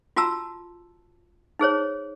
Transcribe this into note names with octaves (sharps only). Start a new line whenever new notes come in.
F4 F#4 A5 A#5 E6
D#4 G#4 C5 C#5